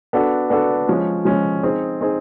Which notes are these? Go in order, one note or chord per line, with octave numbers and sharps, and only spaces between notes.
B3 D4 F#4 A4
B3 D4 F#4 A4
F3 G#3 C#4
F3 G#3 C#4
C4 D#4 G#4
C4 D#4 G#4